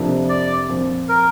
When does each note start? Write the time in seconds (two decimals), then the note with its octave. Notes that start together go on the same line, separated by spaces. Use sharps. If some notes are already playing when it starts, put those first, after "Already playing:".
Already playing: F2 C3 F3 A#3 D4
0.29 D5
0.69 A#2 F3 C4
1.09 A#4